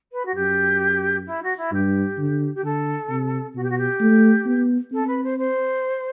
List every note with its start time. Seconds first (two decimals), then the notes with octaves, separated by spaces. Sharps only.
0.12 B4
0.25 F#4
0.34 F#2 G4
1.26 E4
1.42 F#4
1.57 E4
1.72 G2 G4
2.18 D3
2.54 G4
2.64 D3 A4
3.09 C3
3.55 B2 F#4
3.63 G4
3.69 F#4
3.77 G4
4.00 A3
4.46 B3
4.92 C4 A4
5.07 B4
5.23 C5
5.38 C5